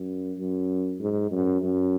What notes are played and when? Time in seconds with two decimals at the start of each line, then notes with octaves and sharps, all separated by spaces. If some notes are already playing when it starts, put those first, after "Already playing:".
Already playing: F#2
0.38 F#2
1.00 G#2
1.31 F#2
1.61 F#2